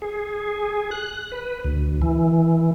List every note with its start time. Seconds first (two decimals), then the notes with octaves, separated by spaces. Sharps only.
0.02 G#4
0.91 F#6
1.32 B4
1.64 D2
2.02 E3